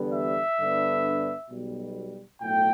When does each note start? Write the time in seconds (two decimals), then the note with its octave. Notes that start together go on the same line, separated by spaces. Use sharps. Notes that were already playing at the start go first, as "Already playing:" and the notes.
Already playing: E2 D3 G3 B3
0.12 E5
0.59 G2 D3 B3 D4
1.49 B1 B2 G3
2.42 B1 A2 A3 G5